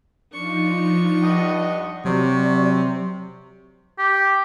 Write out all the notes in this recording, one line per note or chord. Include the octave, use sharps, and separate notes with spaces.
F3 D4 D#4 F4 C#6
G2 D#5 F#5
C3 F#3 F#4 D5 C#6
G4